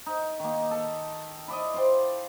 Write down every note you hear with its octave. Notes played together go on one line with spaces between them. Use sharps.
D#4
D#3 A#3
A4
E4 D5 D#5
C5 D5 F5 G5